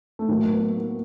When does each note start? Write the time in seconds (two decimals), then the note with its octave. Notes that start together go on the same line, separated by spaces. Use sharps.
0.19 A3
0.29 A2 F#3 A#3
0.44 A#3
0.52 B3
0.75 A#3